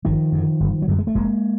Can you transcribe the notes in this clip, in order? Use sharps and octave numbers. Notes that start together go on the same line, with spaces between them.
G1 D#3 F3
F#2 D3
G1
F#3
F#2 D3 G3
G#3
A3
F1 G#3 A#3